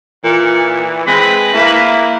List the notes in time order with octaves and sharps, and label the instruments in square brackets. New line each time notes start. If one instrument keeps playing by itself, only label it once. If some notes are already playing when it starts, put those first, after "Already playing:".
[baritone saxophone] A#2 [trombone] E3
[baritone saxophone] G#3 [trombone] C4 [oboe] B4
[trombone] A#3 [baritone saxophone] E4